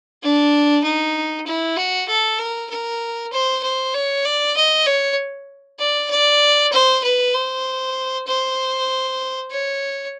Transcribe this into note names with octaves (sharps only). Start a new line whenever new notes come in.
D4
D#4
E4
F#4
A4
A#4
A#4
C5
C5
C#5
D5
D#5
C#5
D5
D5
C5
B4
C5
C5
C#5